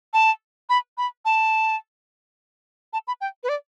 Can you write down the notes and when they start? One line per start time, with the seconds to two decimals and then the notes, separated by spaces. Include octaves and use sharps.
0.13 A5
0.69 B5
0.98 B5
1.25 A5
2.93 A5
3.07 B5
3.21 G5
3.43 B4
3.49 D5